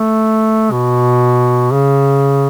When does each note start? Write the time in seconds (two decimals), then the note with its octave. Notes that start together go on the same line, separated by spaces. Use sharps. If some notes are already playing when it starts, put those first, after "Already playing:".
Already playing: A3
0.72 B2
1.72 C#3